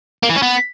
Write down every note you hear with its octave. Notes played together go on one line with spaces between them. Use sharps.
A#3
E3
C#4
B3